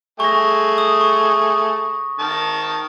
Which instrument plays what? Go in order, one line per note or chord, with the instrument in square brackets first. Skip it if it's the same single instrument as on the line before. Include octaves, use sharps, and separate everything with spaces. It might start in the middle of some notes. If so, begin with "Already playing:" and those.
[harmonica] A3 G#4 [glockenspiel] C#6 A#6
[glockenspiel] D#6
C#6 D#6
[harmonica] D#3 A5